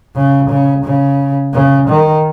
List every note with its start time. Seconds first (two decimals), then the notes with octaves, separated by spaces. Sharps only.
0.15 C#3
0.49 C#3
0.84 C#3
1.53 C#3
1.88 D#3